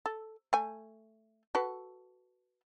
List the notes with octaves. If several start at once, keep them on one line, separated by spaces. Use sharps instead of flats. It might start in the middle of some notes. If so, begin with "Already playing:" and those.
A4
A3 G#5
F#4 A4 B4